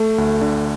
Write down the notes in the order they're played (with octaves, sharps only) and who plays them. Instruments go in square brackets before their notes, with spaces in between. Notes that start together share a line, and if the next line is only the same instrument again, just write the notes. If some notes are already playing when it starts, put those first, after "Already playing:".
Already playing: [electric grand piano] A3 [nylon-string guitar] A4
[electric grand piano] D2
D3